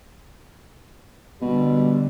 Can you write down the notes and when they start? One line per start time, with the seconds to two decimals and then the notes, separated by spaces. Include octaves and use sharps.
1.42 B2 D3 G3